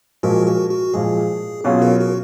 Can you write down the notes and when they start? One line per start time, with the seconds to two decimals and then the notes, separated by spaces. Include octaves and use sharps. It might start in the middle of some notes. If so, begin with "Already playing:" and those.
0.23 A#2 F3 G#3 F#4 A#4
0.46 F#4
0.70 F#4
0.94 A#2 F3 G#3 G#4
1.64 B2 F#3 C#4 F4 G#4
1.82 F#4 A#4
2.00 F#4 A#4